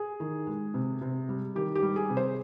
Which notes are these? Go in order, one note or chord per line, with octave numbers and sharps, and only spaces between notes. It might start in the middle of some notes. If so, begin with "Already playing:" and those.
Already playing: G#4
D#3
G#3
C3
C3
G3
D#3 G4
G4
G3
G#4
C3
C5